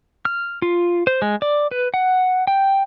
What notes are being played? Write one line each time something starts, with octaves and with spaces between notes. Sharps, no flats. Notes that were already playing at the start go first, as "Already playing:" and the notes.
F6
F4
C5
G#3
D5
B4
F#5
G5